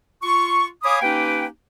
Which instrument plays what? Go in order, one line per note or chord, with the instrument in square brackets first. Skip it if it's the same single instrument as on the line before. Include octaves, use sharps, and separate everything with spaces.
[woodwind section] F4 C#6
C#5 F5 G#5 B5 D6 D#6
A#3 C#4 D#4 G4 B4 G5